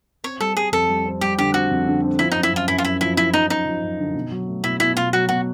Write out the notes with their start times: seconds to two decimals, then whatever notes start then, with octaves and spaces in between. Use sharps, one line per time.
0.24 C4 C#5
0.40 G3 A4
0.56 G3 G#4
0.72 F2 A4
0.89 G3
1.05 C4
1.21 G3 G4
1.38 D3 G4
1.54 C4 F#4
1.71 F2
1.87 D3
2.03 C4
2.19 F3 E4
2.32 F#2 D#4
2.43 E4
2.52 F#2 F4
2.68 F#2 E4
2.78 F4
2.84 F#2 E4
3.01 F3 E4
3.17 F3 E4
3.34 F3 D#4
3.49 F#2 D#4
3.66 F3
3.82 F#2
3.99 D3
4.15 B2
4.31 F#3
4.48 A3
4.63 B2 E4
4.80 B2 E4
4.96 B2 F4
5.13 F#3 F#4
5.29 B2 F#4